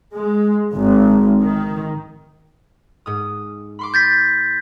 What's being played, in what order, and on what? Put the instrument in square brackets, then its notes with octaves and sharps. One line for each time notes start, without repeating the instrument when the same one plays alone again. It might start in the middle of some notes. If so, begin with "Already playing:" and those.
[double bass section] G#3
G#1
D#3
[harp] G#2 D#6
B5 C6 D6
[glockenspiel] G6 A6 B6